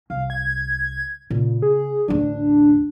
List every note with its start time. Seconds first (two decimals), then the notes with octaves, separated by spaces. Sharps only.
0.10 C2 F5
0.30 G#6
1.30 A#2 C#3
1.62 G#4
2.08 A1 D2 D4